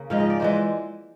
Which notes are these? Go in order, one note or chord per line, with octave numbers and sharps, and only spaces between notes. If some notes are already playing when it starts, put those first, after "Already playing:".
Already playing: C#3 A#3
G#2 F3 G#3 F5
D#5
D5
E3 G#3 C5